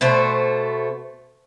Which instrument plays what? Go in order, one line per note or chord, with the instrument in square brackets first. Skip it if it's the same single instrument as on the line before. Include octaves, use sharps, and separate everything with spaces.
[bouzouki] B2 A3 C5